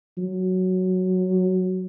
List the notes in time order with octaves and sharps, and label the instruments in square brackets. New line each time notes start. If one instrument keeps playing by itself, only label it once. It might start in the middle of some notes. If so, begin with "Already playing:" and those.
[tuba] F#3